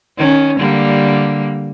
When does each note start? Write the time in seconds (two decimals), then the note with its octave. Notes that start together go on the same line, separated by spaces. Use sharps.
0.18 D#3 C#4
0.59 D3 G3 A#3